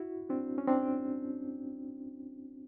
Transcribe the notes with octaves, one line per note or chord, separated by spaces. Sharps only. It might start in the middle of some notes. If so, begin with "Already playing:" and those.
Already playing: E4 F#4
C4 D4
C#4
C4 D4